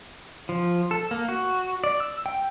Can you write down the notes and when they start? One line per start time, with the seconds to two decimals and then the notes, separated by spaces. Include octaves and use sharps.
0.49 F3
0.91 A4
1.11 A#3
1.29 F#4
1.84 D5
2.00 E6
2.26 G5